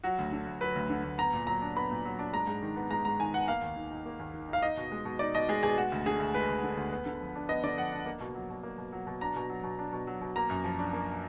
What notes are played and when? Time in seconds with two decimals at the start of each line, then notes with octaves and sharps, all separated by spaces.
0.04 F#3 F#4
0.19 D2
0.32 D3
0.47 D2
0.61 F#3 B4
0.76 D2
0.90 D3
1.04 D2
1.18 B3 A#5
1.33 A#2
1.47 F#3 A#5
1.62 D4
1.76 B3 B5
1.91 A#2
2.05 F#3
2.19 D4
2.33 G#3 A#5
2.47 G#2
2.62 D#3
2.76 B3
2.91 G#3 A#5
3.05 G#2 A#5
3.19 D#3 G#5
3.34 B3 F#5
3.48 A#3 F5
3.62 D#2
3.76 D#3
3.91 D#4
4.06 A#3
4.19 D#2
4.34 D#3
4.48 D#4 F5
4.62 D#4 D#5
4.77 B2
4.92 G#3
5.05 B2
5.19 D#4 D5
5.35 B2 D#5
5.49 G#3 G#4
5.63 B2 G#4
5.77 G#3 F#4
5.92 D2
6.06 D3 G#4
6.20 D2
6.34 G#3 B4
6.49 D2
6.63 D3
6.77 D2
6.92 B3
7.06 D3
7.21 F3
7.35 D4
7.49 B3 D#5
7.64 D3 D5
7.78 F3 F#5
7.92 D4
8.06 A#3
8.20 B2
8.35 F#3
8.50 B2
8.63 A#3
8.78 B2
8.92 F#3
9.07 B2
9.21 D4 A#5
9.36 B2
9.50 F#3
9.63 B2
9.79 D4
9.93 B2
10.07 F#3
10.21 B2
10.36 A#3 A#5
10.50 F#2
10.64 F3
10.79 D4
10.93 A#3